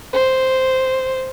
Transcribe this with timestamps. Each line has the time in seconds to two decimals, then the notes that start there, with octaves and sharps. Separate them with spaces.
0.13 C5